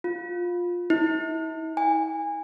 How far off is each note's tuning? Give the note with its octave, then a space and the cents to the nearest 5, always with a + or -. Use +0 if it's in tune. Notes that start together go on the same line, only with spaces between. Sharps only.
F4 +15
E4 -45
G#5 -25